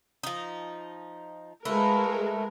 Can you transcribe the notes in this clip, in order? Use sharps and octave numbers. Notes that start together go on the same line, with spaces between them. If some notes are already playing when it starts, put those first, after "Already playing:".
F3 D#4
G#3 A3 F4 A#4 B4